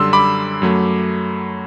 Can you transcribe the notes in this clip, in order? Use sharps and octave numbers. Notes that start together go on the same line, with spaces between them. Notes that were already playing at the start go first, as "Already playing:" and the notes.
Already playing: F#2 D3 G3 C6 E6
B5 D6
F#2 F#3 A3